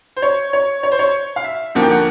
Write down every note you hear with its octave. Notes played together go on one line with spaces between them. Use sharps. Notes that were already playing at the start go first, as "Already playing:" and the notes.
C5
C#5
C#5
C#5
C5
C#5
F5
E5
D#2 D3 F3 A#3 F#5
G5
F#5